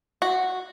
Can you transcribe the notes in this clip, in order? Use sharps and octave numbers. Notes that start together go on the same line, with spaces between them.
F#4